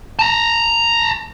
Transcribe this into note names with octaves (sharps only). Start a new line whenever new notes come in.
A5 A#5